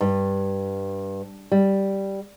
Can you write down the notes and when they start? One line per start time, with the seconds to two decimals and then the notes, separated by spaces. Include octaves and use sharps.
0.01 G2
1.52 G3